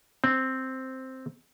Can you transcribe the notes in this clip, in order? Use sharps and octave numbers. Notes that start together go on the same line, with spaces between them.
C4